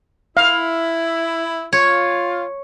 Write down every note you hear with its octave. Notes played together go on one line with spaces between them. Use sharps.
E4 F5
F4 C#5